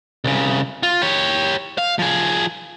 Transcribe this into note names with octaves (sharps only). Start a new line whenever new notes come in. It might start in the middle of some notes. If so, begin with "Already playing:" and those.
C2 C#3
F4
G4 C#5
F5
F3 G#4